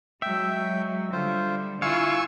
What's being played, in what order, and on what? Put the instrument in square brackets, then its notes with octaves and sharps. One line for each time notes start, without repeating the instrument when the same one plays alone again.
[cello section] F#3 G#3 [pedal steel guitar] E5 [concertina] G5
[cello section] D3 G3 [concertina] F4 C5
[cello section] E4 F4 [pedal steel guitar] F5 [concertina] F#5 [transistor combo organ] G#5 C#6 E6